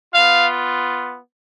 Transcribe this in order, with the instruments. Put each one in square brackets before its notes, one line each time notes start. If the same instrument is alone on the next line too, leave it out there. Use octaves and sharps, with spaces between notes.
[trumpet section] B3 F4 F5